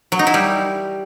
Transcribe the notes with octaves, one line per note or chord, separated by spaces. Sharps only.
F#3
D#4
E4
G3